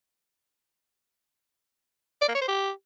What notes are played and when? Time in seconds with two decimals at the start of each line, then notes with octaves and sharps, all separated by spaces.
2.22 D5
2.28 A#3
2.35 C#5
2.41 C5
2.48 G4